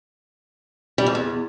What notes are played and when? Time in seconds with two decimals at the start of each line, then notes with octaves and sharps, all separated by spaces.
0.98 G3
1.07 F2
1.15 E2